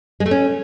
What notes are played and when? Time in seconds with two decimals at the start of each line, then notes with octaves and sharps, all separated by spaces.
0.20 G#3
0.26 A3
0.31 C#4